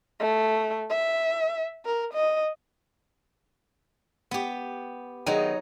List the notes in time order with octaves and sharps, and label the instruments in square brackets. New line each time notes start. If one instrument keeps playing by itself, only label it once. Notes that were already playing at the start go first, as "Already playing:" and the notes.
[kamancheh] A3
E5
A#4
D#5
[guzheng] B3 G4
[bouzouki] D#3 G#3 B3 [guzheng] F#3 D#4